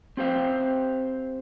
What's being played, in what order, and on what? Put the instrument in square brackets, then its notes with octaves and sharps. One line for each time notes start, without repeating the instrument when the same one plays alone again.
[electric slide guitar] C4 G4 C5 F5